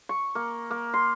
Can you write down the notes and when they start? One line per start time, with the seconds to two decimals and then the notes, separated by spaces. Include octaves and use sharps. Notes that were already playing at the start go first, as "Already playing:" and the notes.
0.09 C#6
0.35 A#3
0.71 A#3
0.94 C6